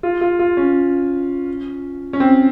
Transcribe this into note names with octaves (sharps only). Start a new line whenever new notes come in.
F4
F4
F4
C#4
C#4
C4